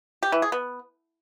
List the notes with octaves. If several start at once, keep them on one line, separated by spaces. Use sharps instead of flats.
G4
E3
G#4
B3